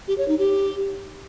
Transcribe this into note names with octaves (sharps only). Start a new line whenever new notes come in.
G4
C#5
D#4
G4